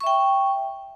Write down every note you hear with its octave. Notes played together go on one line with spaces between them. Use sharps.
E5 G5 C#6